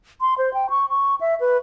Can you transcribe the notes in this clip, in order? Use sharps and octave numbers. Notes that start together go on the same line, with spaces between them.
C6
C5
G5
C#6
C#6
E5
B4